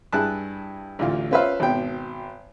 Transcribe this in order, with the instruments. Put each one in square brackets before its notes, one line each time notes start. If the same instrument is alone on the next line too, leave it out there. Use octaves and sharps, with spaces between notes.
[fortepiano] G2 E4 G#4 A5 F#6
A1 D2 F4
C#4 F4 B4 C5 E5 F5
G#1 B2 G5